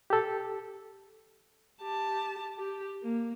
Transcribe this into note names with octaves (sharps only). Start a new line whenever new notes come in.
G4 A4
G4 A5
G4
A#3